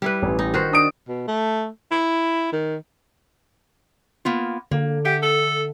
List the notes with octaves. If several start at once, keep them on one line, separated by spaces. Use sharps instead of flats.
G3 E4 B4
A1
D#4
D#3 F#4 C5
D4 D#6 D7
B2
A3
E4
D#3
A#3 B3 F4
D3 A#3
G4 E5 F#5
A4